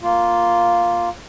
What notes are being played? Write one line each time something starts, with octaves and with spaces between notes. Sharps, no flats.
A#3 F4